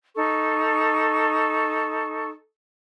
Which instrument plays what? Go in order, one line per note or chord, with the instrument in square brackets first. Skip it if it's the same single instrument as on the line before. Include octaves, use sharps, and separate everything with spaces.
[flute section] D#4 A4 C#6